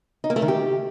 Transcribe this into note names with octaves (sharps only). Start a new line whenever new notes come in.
D#4
A#3
A3
D#3
G4